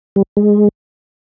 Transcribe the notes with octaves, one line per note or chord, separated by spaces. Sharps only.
G3
G#3